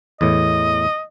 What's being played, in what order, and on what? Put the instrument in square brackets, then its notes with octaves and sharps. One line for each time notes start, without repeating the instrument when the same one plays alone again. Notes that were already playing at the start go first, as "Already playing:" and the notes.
[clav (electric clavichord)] E2 A2 [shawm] D#5